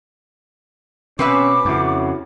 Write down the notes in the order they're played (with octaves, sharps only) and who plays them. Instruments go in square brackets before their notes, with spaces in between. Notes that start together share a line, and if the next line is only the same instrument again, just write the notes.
[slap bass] B2 [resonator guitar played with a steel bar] C4 B4 E5 [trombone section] C#4 [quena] D6
[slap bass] F2 C#3 [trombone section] C#4 E4 F#4